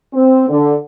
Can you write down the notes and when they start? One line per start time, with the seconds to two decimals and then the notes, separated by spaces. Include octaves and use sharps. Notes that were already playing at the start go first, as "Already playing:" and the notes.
0.13 C4
0.48 D3